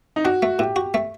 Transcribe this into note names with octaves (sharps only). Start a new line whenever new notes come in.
D#4
D4 F#4
A3
A2 G4
F#4
A3